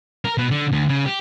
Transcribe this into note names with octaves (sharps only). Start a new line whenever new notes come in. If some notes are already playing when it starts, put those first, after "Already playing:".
A#4
B2
D3
D2
C#3
G4